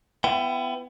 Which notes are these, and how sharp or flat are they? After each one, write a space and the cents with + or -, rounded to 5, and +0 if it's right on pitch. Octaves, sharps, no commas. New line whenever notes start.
B3 +20 E4 +35 G5 +0